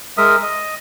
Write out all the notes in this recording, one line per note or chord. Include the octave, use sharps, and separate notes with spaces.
G#3 A#4 E5 D#6
D#5